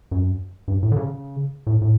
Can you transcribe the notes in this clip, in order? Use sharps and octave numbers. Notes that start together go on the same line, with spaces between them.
F#2
G2
A2
D3
C#3
A2
A2